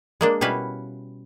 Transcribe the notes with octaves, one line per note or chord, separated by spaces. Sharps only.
G#3 A#3 D4
B2 G3 C#4 E4 B4 F5